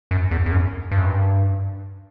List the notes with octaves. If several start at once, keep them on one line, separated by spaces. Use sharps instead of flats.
F#2
E2
E2
F#2
G2
F#2
G2